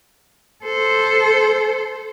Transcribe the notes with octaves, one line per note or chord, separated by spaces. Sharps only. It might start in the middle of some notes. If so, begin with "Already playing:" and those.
A4 C5